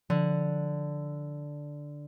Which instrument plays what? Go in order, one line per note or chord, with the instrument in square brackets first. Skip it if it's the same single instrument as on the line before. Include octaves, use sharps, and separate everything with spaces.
[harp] D3 [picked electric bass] F3